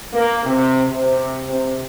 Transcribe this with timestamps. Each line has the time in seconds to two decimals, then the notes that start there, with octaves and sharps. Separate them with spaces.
0.13 A#3
0.44 C3
0.89 C3
1.47 C3